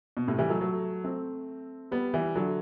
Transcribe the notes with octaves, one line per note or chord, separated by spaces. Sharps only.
B2
A2 C3
E3 G3
F#3 A3
F#3 A3
A3 C4
G3 B3
E3 G3
D3 F#3